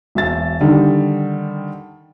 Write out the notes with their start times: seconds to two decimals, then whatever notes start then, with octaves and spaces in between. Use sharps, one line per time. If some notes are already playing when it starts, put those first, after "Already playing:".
0.15 E1 E5 A6
0.61 D3 D#3 G3